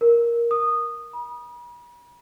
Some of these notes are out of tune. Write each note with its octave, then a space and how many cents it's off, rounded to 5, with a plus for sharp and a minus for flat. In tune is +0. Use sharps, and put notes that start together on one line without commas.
A#4 +10
D#6 -15
B5 -45